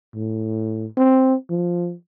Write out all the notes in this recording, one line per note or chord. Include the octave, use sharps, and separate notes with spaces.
A2
C4
F3